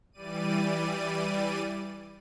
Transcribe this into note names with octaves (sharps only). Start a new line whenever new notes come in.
E3 G3 D5 D#7